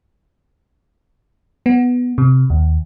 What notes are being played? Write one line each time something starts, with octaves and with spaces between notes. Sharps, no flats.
B3
C3
D#2